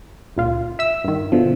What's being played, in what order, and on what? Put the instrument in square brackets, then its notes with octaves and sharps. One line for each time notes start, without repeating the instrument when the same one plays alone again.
[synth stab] C#2 A#2 F4
E5 E6
G2 D#3
[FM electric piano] B2 D3 F3